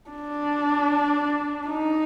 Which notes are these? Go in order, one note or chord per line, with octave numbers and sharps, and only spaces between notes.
D4
D#4